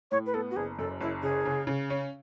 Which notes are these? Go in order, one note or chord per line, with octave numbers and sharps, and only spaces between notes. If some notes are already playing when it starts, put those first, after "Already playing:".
A2 C#5
B4
B3 A4
F#4
F#1 G#4
F#2 A4
F#1 E4
C#3 G#4
C#3
C#3
C#4